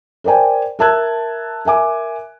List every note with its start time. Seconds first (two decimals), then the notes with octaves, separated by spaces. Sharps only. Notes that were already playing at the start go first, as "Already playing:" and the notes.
0.24 A#4 C5 D5 G5 G#5
0.79 A#4 E5 A5 E6 F#6 G#6
1.65 A#4 E5 G#5 D6